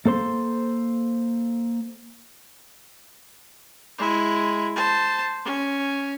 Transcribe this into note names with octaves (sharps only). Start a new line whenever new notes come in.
A#3 A4 C5 C6
G#3 E4
C5 A5
C#4